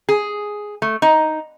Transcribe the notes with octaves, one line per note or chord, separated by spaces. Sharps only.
G#4
A3
D#4